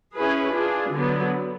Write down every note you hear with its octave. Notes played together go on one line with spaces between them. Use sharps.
C#4 E4 G#4 B4
D4 F4 G#4
D3 F#3 B3